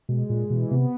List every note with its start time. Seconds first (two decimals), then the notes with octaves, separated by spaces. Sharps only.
0.09 B2 G#3
0.30 A#2 G#3
0.50 B2 E3
0.71 C3 B3